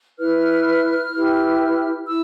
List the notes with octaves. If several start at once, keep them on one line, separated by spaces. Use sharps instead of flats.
E4 B4 F6
E4 G4 B4
E4 E6